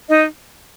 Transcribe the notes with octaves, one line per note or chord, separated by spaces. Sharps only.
D#4 D#5